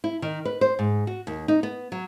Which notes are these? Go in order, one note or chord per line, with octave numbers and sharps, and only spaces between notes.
E4
D#3
B4
C5
G#2
F#4
D#2
D#4
B3
F#3